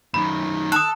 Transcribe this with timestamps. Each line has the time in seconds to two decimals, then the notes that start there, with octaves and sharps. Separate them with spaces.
0.14 F#2 D#3 B5
0.72 A4 A5 D#6 F#6